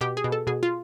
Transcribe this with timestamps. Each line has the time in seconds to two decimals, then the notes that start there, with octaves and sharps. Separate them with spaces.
0.01 B2 G4
0.17 G#4
0.24 B2
0.32 A4
0.47 B2 G#4
0.63 F4